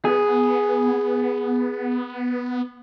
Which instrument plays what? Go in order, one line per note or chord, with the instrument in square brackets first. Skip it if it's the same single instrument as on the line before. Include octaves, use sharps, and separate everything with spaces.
[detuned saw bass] B3 [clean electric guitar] G#4